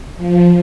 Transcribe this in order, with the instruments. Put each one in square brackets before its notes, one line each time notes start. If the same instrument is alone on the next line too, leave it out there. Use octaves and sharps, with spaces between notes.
[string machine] F3